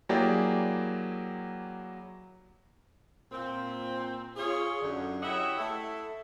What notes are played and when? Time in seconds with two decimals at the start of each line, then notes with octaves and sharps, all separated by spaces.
0.09 F#3 A#3 E4 G4 G#4 D5
3.32 A#2 C4
4.36 F4 G#4 C#5
4.81 F#2 D3
5.21 E4 G4 C#5 D#5 E5 F#5
5.58 A3 E4 A4